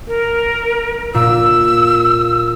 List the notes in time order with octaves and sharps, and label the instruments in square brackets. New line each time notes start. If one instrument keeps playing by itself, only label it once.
[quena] A#4
[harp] A#2 [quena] E6